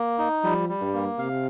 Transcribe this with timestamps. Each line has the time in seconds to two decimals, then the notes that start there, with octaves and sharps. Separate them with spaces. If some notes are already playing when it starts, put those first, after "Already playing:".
Already playing: A#3
0.19 D#4
0.43 F3 G3
0.69 G3
0.81 G2
0.94 A#3
1.18 C3 F5